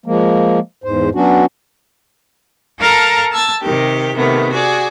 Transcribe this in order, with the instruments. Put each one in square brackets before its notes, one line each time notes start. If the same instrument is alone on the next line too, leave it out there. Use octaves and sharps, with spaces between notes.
[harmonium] F3 G#3 A#3
E2 G#2 C5
F#3 B3 C#4 D4 F#4
[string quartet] A4 A#4 F5 A5 A#5
A5 E6 G#6 A6
C3 D#3 G4
C3 D#3 A3 B3
F#4 G#4 D5